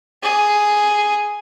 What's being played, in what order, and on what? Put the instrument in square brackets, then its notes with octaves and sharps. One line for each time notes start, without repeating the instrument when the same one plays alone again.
[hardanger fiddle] G#4